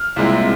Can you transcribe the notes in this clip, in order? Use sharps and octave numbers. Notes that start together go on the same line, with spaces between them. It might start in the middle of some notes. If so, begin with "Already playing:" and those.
Already playing: F6
C2 A#2 G#3 C4 E4